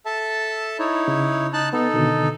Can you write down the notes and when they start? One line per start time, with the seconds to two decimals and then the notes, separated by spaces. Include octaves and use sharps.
0.06 A4 E5 A5
0.79 D#4 E4 C#5
1.08 C#3
1.53 D#4 A5 F#6
1.73 B3 D#4 A4
1.93 B2 D3 D#3